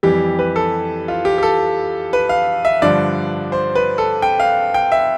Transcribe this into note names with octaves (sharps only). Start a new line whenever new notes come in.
F2 E3 G3 G4
B4
A4
F4
G4
G4
A4
B4
F5
E5
G2 D3 F3 D5
C5
B4
A4
G5
F5
G5
E5